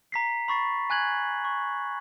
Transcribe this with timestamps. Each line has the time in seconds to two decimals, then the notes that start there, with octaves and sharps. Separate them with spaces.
0.12 A#5 B6 C7
0.48 B5 C#6 A6 C7
0.90 G#5 F#6 G#6 F#7
1.45 C#6